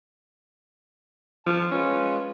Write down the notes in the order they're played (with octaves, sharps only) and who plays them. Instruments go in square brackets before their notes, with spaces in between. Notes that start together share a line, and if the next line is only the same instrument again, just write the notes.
[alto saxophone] F3 [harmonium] A5
[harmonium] G#3 F4 B4 [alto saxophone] C#4